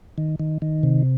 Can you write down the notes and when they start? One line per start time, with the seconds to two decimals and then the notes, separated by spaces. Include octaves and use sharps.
0.18 D#3
0.40 D#3
0.62 D#3
0.83 C3